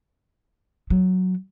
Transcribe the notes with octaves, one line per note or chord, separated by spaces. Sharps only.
F#3